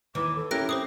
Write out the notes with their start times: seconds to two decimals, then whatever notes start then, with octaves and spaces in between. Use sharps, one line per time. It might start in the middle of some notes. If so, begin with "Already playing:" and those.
0.15 D#2 E3 D6
0.36 A4
0.51 C#4 E4 G4 A#4 F#6 A#6 D7
0.69 C4 C5 D6 D#6